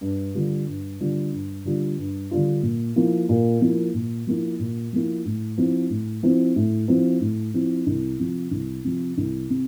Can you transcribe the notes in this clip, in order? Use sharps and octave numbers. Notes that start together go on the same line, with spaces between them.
G2
D3 G3 D4 F4
G2
D3 G3 D4 F4
G2
D3 G3 D4 F4
G2
D3 G3 D4 F4
A#2
F3 A#3 E4
A#2
F3 A#3 E4
A#2
F3 A#3 E4
A#2
F3 A#3 E4
A2
F3 C4 E4
A2
F3 C4 E4
A2
F3 C4 E4
A2
F3 C4 E4
C2
C3 F3
C2
C3 F3
C2
C3